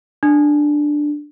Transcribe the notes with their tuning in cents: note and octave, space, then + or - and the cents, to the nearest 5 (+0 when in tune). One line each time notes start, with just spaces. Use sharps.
D4 +5